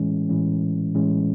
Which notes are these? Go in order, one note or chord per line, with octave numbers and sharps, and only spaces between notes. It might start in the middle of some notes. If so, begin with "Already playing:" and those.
Already playing: A2 E3 G#3 C#4
A2 E3 G#3 C#4
A2 E3 G#3 C#4